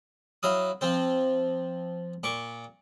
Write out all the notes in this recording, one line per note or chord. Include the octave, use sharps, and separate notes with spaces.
F#3 E4 F5 D#6
F3 C4 C5
A#2 C#6 D6